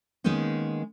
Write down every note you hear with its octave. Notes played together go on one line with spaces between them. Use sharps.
D#3 G#3 A#3 B3 C#4 D#4